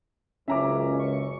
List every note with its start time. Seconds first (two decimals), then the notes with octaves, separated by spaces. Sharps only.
0.48 F#1 C#2 C#4 E5 A#5 D6
0.99 C#6